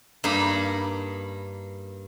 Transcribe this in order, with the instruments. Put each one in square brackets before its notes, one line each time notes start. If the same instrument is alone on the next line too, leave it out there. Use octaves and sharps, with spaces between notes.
[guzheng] G2 A#3 D#4 A#5 B5